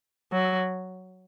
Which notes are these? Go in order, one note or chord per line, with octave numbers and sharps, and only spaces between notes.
F#3